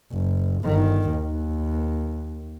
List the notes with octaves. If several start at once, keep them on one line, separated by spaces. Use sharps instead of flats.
F#1
G1 D#3
D#2